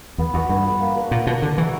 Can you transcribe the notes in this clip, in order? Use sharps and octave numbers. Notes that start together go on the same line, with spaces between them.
E2 B3
E2 F#4 B4
G2 B3
F#4 B4
A#3
D4 F#4 B4
A#2 A#3
B2 D4 F#4 B4
D3 D4
E3 F#4 A#4 E5